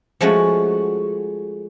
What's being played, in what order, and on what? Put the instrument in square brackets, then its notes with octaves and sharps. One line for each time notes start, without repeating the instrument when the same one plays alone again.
[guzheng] F3 G#3 A3 C#4 F#4